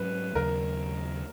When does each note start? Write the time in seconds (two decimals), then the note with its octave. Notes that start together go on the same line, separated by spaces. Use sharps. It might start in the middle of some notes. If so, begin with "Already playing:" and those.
Already playing: G#2 F#3 C#4 B4
0.35 D#2 C#3 F#3 A#4